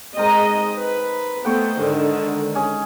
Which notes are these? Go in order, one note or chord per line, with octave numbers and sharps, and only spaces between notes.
G#3 C4 D#4 A#4 D#5
B4
A3 B3 C5 F#5 G5 C#6
G#2 D3 D#3
C#4 G#4